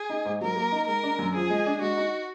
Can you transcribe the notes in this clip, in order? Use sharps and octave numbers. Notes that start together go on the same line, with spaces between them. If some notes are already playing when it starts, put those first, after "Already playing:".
Already playing: G#4
D#4
G#2
F#3 A#4
A#3
D#4
G#3 A#4
D4
F#2
F3 G#4
G#3
D4
G#3 F#4
D#4